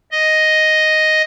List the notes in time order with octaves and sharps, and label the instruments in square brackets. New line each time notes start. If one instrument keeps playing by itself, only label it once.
[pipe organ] D#5